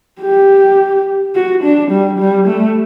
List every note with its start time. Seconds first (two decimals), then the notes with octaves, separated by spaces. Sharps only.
0.21 G4
1.35 F#4
1.63 D4
1.91 G3
2.19 G3
2.47 A3